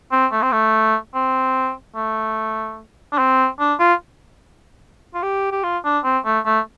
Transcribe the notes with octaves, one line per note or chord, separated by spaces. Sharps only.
C4
A3
C4
A3
C4
A3
D4
C4
D4
F4
F4
G4
G4
F4
D4
C4
A3
A3